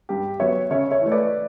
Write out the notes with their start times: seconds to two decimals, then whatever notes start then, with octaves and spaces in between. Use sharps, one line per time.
0.09 G2 G4
0.40 F#3 B3 C#5 E5
0.71 C#3 C#5 E5
0.91 C#5 E5
1.02 E3 A3
1.12 B4 D5